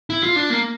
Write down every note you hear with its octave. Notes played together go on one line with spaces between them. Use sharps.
E4
F4
D4
A#3